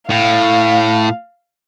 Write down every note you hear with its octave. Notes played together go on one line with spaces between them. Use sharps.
A2 F5